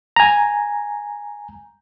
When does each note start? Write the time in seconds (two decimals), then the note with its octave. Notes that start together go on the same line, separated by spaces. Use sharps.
0.16 G#5 A#5